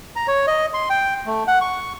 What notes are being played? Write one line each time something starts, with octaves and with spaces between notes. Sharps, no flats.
A#5
C#5
D#5
C6
G5
A3
F#5
C#6